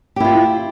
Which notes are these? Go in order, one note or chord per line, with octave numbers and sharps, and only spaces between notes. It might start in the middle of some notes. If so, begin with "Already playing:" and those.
E4 F4 G4